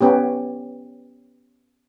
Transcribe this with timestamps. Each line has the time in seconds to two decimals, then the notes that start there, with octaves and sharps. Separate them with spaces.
0.01 B3 C#4 G4